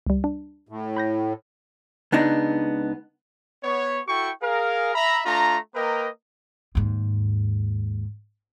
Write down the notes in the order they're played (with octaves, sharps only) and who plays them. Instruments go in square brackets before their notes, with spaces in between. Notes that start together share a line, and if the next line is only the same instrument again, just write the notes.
[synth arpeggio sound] C#2 G3
D4
[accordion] A2
[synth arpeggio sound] B5 G6 A#6
[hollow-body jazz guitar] C#2 B3 D4 D#4
[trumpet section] B3 C#5
E4 F#4 A4 G5 C#6
G#4 A#4 F5
E5 A#5 B5
A3 D4 F4 A#5
A#3 A#4 B4 D#5 G5 A#5
[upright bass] D#2 G#2